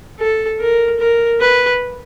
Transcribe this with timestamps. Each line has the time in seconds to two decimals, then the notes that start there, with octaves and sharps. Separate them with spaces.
0.20 A4
0.60 A#4
1.00 A#4
1.40 B4